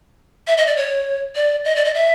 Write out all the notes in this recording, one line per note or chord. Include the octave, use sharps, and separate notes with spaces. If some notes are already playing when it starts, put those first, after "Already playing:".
E5
D#5
D5
C#5
D5
D#5
D5
D#5
E5